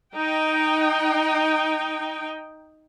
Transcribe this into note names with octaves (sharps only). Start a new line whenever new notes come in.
D#4 G5